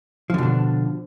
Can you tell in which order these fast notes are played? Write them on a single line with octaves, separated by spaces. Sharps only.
F3 D3 B2 D4